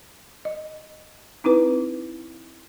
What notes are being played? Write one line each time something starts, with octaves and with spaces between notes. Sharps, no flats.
D#5
C4 D#4 E4 B4